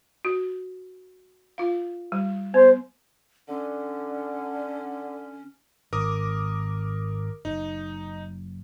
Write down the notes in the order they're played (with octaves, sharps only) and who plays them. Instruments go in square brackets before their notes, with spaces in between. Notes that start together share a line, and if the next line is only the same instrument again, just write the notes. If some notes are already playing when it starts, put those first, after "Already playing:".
[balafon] F#4
F4 F5
G3
[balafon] B3 [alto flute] C5
[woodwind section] D3 [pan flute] C#4
[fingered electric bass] G#1 [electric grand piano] A#4 D6 D#6
[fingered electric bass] F#1 [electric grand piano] D#4